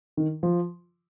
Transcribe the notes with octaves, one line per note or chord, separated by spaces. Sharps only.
D#3
F3